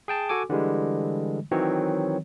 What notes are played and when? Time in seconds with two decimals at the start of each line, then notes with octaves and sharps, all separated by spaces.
0.08 G#4 G5 A5
0.29 F#4 A4 G#5 D6
0.50 D3 E3 G3 G#3
1.51 D#3 E3 F#3 C4 C#5